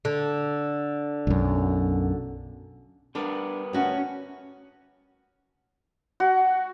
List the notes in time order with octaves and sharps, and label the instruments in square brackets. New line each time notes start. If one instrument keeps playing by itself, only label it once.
[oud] D3
[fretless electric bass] B1 F#2
[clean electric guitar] G3 B3 A#4 [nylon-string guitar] D4 D5
[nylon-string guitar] D2 F#4 A5 [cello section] C#4
[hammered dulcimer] F#4